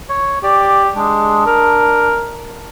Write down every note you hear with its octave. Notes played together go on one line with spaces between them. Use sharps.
C#5
G4 D5
G#3 D4
A#4